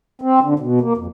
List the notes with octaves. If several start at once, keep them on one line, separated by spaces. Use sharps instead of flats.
C4
D3
B2
A#3
F2